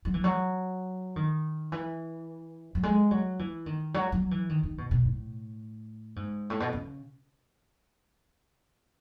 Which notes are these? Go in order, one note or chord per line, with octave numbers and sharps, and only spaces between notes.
F#3
E3
F#3
D#3
E3
F#3
G#3
F#3
E3
D#3
F#3
F#3
E3
D#3
D#3
B2
B2
A2
G#2
A2
B2
C#3